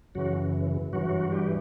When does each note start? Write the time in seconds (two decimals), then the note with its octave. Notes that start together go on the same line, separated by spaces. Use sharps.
0.15 F#2 C#3 E3 F#3 F#4
0.93 G2 E3 F#3 F#4
1.31 G3 G4